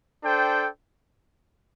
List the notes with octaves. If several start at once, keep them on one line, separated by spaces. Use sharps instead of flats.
D4 A4 C5 G5